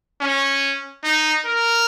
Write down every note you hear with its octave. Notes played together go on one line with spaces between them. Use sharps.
C#4
D#4
A#4